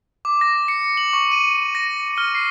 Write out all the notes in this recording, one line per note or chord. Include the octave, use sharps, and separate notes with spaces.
D6
A#6
C#7
F#7
C#6
D#7
A#6
F6
C7